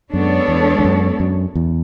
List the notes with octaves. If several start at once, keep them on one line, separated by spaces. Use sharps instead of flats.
F#2 G#3 B3 D4 A4 C#5
E2
E2
F#2
F#2
E2